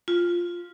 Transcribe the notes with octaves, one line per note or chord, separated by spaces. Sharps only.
F4